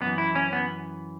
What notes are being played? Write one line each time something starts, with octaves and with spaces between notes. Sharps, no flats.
F#2 E3 B3
E4
C#4
B3